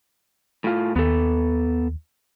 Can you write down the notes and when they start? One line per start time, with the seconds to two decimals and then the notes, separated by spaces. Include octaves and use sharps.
0.64 A2 F4
0.96 D#2 B3 A4